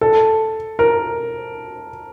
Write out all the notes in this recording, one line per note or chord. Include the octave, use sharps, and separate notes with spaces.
A4
A#4